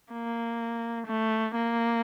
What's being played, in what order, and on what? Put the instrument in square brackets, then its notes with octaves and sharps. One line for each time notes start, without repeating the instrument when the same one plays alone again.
[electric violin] A#3
A3
A#3